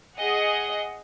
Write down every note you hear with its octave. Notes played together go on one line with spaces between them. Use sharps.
G#4 D#5 F#5